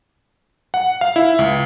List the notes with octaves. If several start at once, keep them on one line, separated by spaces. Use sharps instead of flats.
F#5
F5
E4
C#2